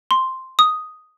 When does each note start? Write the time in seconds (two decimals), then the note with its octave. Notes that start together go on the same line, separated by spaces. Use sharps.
0.11 C6
0.59 D#6